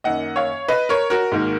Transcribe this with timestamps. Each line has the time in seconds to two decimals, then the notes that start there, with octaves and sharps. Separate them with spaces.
0.04 F#2 D#3 A#3 D#5 F#5
0.36 C#5 F5
0.68 B4 D#5
0.89 A#4 C#5
1.10 F#4 A#4
1.32 G#2 D#3 A#3